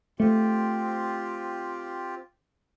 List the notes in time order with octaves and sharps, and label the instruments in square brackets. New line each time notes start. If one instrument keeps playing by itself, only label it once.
[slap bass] A3 [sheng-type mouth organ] C4 F4 G4